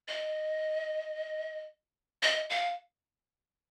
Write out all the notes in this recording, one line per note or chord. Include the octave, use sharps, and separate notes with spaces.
D#5
D#5
F5